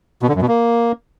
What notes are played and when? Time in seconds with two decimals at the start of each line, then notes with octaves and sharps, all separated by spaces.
0.22 B2
0.29 D3
0.35 F#2
0.42 B2
0.48 A#3